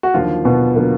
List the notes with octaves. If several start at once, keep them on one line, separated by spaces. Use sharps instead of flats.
F#4
D#2 D3 F3 F#3 F4
B2 B3
D3 F#3 A#3